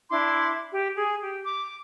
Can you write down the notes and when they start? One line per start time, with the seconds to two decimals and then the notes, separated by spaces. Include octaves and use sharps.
0.10 D4 E4 C6 D6
0.72 G4
0.96 G#4 G#5
1.21 G4
1.46 D6